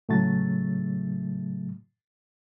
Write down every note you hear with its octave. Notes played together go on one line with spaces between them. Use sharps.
A2 C#3 F#3 A3 A6